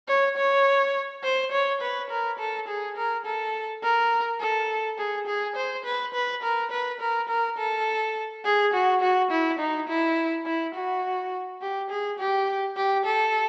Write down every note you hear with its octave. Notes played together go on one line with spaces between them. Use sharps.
C#5
C#5
C5
C#5
B4
A#4
A4
G#4
A#4
A4
A#4
A4
G#4
G#4
C5
B4
B4
A#4
B4
A#4
A#4
A4
G#4
F#4
F#4
E4
D#4
E4
E4
F#4
G4
G#4
G4
G4
A4